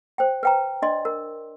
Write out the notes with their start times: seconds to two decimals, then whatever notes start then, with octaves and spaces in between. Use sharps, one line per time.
0.18 C5 G5
0.43 B4 G5 A#5
0.82 D4 D5 D#5 C6
1.05 A#4